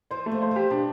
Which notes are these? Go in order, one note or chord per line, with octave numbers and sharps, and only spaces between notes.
E3 C5
A3
F3
C5
E3 G4
B2 D4